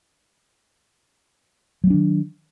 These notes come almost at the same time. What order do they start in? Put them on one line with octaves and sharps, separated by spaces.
F#3 A3 D4 D#3